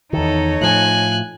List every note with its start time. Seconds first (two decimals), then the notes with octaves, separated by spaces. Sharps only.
0.13 E2 D#3 D#4 A4 C#5
0.61 A2 F3 G#5 F#6